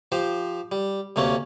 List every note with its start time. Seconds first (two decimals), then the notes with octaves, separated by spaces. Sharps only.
0.12 F3 G4 C5
0.72 G3
1.16 D2 C3 A3 A#3 C#4